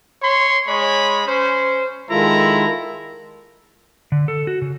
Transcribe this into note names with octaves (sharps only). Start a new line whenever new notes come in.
C#5 C6
G#3 C#5 B5
C#4 C5
D#3 G#3 E4 F4 A4 A#5
D3
A4
F#4
C#3